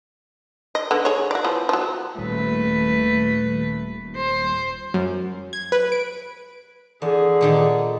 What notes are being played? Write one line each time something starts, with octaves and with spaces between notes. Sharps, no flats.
D#5
D3 B3
G#4 C#5
F#4 D5
E3 F3 B3
F3 F#3
D#1 A3 B4
C5
F#2
G#6
B4
D7
E2 D3 G#4
A#2 D#3 G4